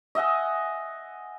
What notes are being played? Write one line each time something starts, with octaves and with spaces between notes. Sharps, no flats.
D#5 E5 F#5 G#5